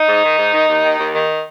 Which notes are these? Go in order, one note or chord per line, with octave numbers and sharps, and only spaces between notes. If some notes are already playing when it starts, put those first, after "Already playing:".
Already playing: D#4
G#2
D#3
G#2
D#3
D#2
D#3
D#2
D#3